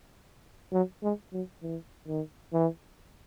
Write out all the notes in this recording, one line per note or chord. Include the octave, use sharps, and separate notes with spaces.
F#3
G#3
F#3
E3
D#3
E3